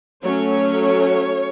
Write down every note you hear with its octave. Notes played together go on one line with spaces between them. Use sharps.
F#3 A3 C#4 C#5